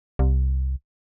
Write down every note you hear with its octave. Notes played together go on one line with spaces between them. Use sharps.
C2